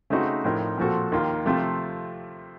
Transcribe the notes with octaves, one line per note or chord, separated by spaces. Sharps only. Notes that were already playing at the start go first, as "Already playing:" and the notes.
C#3 A3 C4 D#4 F#4
A2 F3 C4 D#4 A#4
A#2 F3 C4 F#4 A4
D#2 D#3 A#3 F4
C3 F3 A3 C4 F4